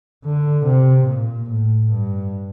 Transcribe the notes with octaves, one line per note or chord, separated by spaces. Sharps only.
D3
C3
A#2
A2
G2